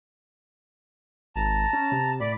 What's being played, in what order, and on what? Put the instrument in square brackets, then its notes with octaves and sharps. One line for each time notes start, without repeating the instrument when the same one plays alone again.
[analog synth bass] G#1 [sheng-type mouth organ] A5 A#5
[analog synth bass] C#4
C3
[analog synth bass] A2 [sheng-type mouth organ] D5 B5